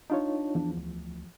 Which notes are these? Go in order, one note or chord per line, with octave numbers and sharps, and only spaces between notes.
D4 D#4 F4 C#5
E2 F3
D2